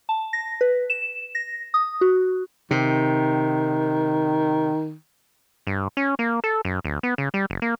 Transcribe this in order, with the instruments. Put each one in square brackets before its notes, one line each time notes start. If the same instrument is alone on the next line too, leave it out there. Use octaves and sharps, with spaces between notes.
[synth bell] A5
A#6
B4
E7
A#6
D#6
F#4
[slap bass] C3 [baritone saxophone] D#3
[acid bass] G2
C#4
A#3
A4
F#2
D2
B3
C#3
G3
F#1
A#3